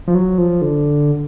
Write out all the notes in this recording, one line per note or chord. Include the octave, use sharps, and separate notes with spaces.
F3
F#3
F3
D3